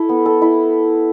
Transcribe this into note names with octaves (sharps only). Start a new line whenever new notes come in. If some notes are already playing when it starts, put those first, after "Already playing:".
Already playing: E4 A4
B3
A4
E4